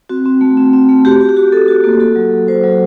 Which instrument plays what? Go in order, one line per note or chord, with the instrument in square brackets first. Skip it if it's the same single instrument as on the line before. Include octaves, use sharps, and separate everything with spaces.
[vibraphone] C4 F#4
C4
A3
C4
C4
A3
F#4 G4
F#4
G4
F#4
F#4 A4
F#4
A#3
F#4 A4
F#3
F#3
F#3 C5
F#3